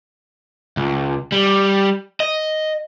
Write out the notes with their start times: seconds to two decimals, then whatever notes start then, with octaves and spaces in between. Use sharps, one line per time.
0.77 C#2
1.32 G3
2.20 D#5